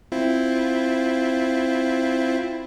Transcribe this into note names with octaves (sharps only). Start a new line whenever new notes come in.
C4 E4 F4